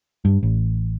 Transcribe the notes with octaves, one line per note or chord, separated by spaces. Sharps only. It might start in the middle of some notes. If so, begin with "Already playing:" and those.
G2
A1